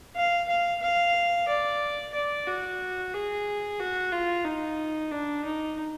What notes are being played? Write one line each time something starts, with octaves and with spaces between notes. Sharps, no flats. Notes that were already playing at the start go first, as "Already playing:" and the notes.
F5
F5
F5
D5
D5
F#4
G#4
F#4
F4
D#4
D4
D#4